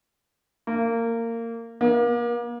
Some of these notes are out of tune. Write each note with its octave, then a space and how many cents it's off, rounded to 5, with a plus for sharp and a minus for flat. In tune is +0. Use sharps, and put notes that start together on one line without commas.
A#3 -20
A#3 +35